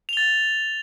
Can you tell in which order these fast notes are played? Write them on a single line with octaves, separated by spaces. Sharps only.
F7 G7 A6